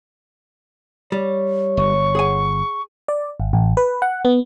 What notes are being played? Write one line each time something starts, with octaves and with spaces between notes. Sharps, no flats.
G3 C#5
G1 C#6
G#4 F#5 G#5
D5
G#1
A1
B4
F#5
B3